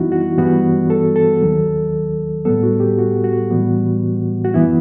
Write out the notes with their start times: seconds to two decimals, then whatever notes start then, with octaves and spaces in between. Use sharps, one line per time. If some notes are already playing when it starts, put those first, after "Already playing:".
Already playing: F#2 E3 G3 B3 D#4 E4 F#4
0.12 F#4
0.37 G2 E3 G3 B3 F#4
0.90 A4
1.16 A4
1.42 D#2 D#3 F#3
2.45 A2 G3 B3 A4
2.63 F#4
2.80 G4
2.99 F#4
3.24 F#4
3.50 A2 E3 G3 B3
4.45 F#4
4.54 F#2 E3 B3 E4